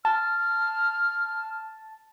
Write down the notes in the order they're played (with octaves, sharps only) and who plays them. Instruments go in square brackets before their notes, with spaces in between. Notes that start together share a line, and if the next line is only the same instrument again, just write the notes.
[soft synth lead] A5 [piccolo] F6